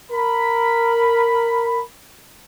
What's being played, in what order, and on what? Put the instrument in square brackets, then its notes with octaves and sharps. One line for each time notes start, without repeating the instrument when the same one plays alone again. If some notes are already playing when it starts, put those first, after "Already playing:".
[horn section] A#4 B5